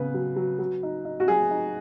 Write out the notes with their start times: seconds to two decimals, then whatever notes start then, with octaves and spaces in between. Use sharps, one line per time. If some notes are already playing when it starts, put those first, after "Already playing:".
Already playing: C#3 B3 B4
0.14 F#3
0.36 F#3
0.59 F#3
0.83 D#4
1.05 D#4
1.20 F#4
1.28 F#3 G#4
1.51 D#4